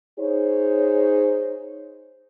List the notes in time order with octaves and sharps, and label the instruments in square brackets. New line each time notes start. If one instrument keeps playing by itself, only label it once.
[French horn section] D#4 G#4 C5 C#5